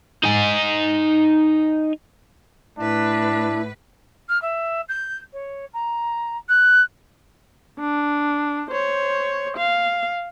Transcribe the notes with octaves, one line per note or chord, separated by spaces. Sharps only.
D#4 G#5
A2 D4 E4 B4
F6
E5
G6
C#5
A#5
F#6
D4
C5 C#5
F5